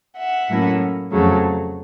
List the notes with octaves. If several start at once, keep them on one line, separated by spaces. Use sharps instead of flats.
E5 F#5
A2 F#3 A#3 C#4 E4
F2 C#3 F#3 A3